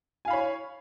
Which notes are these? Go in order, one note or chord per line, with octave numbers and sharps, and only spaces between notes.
C#5 F5 G#5 B5